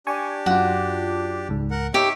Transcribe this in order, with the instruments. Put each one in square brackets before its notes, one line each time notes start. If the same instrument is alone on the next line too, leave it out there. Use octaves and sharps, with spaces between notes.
[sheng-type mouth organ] D4 G4 [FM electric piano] G#5 C#6
[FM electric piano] F#2 F4 [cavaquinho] F#4
[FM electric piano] C#2 G#2
[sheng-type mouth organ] A#4 F#5
[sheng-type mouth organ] D#4 C#5 E5 [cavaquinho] G4